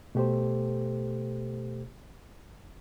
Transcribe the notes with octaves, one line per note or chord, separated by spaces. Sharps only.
B2 A3 G4 A4 C5